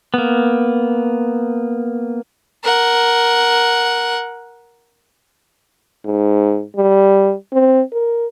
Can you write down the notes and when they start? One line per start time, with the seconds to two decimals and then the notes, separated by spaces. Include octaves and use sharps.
0.14 A#3 B3
2.64 A#4 F#5
6.05 G#2
6.77 G3
7.53 C4
7.93 A#4